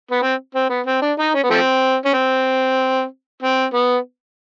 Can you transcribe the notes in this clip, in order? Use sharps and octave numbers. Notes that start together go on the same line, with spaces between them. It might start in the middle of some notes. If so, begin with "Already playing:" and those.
B3
C4
C4
B3
C4
D4
D#4
C#4
B3
F3 A3 C4
C#4
C4
C4
B3